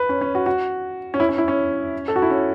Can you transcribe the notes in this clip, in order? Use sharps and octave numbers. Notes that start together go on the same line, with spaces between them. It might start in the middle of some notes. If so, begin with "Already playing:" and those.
Already playing: B4
C#4
C#4
F#4
F#4
C#4
E4
C#4
E4
C#4
A4
F#4
E4
C#4